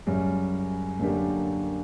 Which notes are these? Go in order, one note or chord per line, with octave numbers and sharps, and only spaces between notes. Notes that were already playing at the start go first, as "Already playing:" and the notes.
F#2 C#3 G3
F#2 D3 A#3 D4 G4